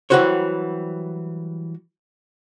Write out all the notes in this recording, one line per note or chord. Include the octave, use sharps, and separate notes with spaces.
E3 F#3 G3 F#4 C5 C#5